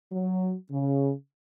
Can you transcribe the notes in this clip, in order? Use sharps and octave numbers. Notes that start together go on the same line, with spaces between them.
F#3
C#3